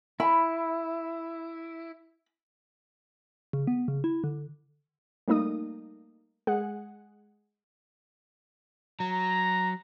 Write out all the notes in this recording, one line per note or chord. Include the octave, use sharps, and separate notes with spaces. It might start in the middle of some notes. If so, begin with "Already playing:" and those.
E4 B5
C#3
B3
C#3
E4
D3
G3 A3 A#3 D#4 D#6
G#3 G#4 F#5
F#3 A#5